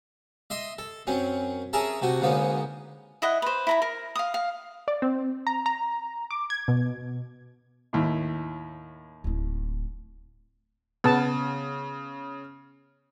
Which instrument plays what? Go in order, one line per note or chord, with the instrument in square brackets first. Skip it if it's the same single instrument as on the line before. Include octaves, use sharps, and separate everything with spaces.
[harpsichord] D#5 E5 C6 D#6
A4
F#2 C4 C#4
C#4 G#4 A#4 E5 A5 A#5
C3 A3 F#4
D2 G#2 A#3 B3 C#4
[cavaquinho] E4 D#5 F#5
B4 C5
E4 A#5 B5
A#4
F5 D#6
F5
[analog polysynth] D5
C4
A#5
A#5
D6
G#6
B2
[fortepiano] D#2 A2
[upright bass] D1 E4
[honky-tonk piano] C#3 [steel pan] B3 A5